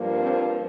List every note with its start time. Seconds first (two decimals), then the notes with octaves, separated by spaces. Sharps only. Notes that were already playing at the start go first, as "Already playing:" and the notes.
Already playing: G2 F3 A#3
0.20 C4